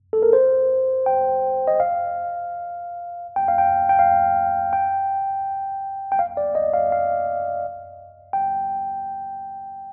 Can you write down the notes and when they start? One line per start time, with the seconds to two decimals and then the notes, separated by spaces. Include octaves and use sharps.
0.13 A4
0.23 A#4
0.33 C5
1.06 G5
1.68 D#5
1.80 F5
3.36 G5
3.48 F5
3.58 G5
3.89 G5
3.99 F5
4.73 G5
6.12 G5
6.19 F5
6.37 D5
6.55 D#5
6.74 F5
6.92 F5
8.33 G5